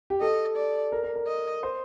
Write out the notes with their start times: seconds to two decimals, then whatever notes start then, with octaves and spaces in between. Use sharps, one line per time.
0.10 G4
0.21 A4 D#5
0.56 D5
0.92 A#4
1.03 A#4
1.15 A#4
1.27 D#5
1.63 C5